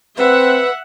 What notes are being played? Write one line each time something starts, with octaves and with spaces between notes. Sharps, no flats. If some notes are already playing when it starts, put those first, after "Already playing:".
C4 B4 E5 F#5